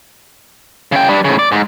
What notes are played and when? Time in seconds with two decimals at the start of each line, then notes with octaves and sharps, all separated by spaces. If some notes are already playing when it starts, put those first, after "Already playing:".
0.92 C#3 G5
1.09 G3 D4
1.25 A2 C#3
1.39 D5
1.52 G#2